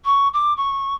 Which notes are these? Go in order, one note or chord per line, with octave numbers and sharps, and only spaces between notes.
C#6
D6
C#6